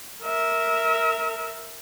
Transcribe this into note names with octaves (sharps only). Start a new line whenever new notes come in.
A#4 E5